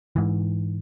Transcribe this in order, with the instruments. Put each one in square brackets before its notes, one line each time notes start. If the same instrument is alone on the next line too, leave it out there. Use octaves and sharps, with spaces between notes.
[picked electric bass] G#2 E3